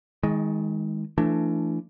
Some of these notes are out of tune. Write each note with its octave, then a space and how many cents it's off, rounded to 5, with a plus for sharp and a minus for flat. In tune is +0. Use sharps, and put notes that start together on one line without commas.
D#3 +35 G#3 +0
E3 +30 A3 +10 D4 +0